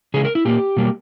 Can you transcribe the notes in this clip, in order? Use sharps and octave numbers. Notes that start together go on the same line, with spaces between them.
C#3 E3 G#3 G#4
A#4
E4
A#2 A#3 G4
B2 G3 A#3